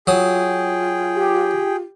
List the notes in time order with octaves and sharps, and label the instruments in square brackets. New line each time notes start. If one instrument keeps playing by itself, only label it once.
[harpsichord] F#3 D#6 [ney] F4 [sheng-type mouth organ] G#4 G5
[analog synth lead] G4